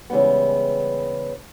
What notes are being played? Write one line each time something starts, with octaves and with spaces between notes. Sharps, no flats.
C#3 E3 G3 G#3 B3